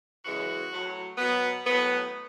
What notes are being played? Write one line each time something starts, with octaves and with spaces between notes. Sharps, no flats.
F#2 C#3 E3 G#3 F#4
A2 F#3
B2 F#3 B3
A2 F#3 B3